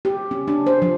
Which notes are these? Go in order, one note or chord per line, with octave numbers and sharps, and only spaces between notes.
G4
C#4
D4
C5
F3